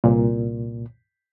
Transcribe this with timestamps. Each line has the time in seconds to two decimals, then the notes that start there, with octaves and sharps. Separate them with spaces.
0.04 C2 A#2